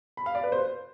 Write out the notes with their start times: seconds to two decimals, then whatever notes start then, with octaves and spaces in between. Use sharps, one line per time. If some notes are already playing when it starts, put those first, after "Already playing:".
0.17 B5
0.26 F5
0.35 D5
0.43 B4
0.52 C5